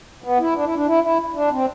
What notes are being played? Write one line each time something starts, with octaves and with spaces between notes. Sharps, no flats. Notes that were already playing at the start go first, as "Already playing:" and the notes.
B3
E4
D4
E4
D4
E4
E4
D4
C4